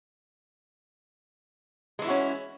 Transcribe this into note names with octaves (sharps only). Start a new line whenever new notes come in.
E3 G#3 C#4 E4 F#4